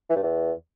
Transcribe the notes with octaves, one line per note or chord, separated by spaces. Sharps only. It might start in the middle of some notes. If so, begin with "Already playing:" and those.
E3
G2
E2